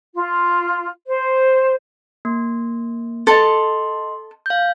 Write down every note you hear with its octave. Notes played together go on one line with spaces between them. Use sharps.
F4
C5
A#3
A4 D#5 A5 C6
F5 G6